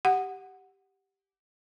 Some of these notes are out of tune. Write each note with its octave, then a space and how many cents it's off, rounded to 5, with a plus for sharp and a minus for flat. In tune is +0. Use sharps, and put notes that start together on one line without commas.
G4 +0 F#5 +0